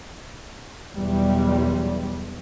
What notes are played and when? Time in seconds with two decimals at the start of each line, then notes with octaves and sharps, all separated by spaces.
0.94 B1 E2 G3